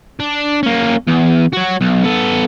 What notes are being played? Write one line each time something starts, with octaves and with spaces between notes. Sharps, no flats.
D4
A#3 C#4
E2
F#4 C#5
B1
B3 A4